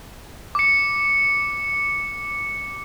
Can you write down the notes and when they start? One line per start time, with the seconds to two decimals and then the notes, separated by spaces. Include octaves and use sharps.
0.55 D6 C#7